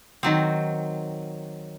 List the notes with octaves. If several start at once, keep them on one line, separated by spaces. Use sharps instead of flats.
D#3 F#3 C4